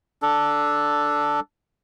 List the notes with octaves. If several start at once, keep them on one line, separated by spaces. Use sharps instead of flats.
D4 A4